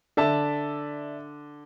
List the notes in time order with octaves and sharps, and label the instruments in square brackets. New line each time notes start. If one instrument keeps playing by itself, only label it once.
[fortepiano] D3 [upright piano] D5 E5 A5